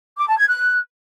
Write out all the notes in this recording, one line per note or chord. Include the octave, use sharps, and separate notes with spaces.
D6
A5
G#6
F#6